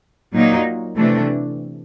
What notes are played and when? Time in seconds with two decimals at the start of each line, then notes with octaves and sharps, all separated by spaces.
0.34 A#2 F#3 A#3 D#4
0.96 C3 E3 A3 D4